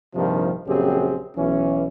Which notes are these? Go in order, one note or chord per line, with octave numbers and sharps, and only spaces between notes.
A#1 G2 C3 D#3 F3
A#1 F#2 C#3 C4 G4 G#4
B1 E3 C#4